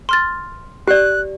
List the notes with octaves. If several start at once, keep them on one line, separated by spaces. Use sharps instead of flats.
C6 F6 A6
G4 D5 F#6